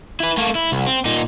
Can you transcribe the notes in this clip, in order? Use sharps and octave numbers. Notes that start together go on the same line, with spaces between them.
E4 B4
A3 A#3
E4
C2
C4
A#2 D#4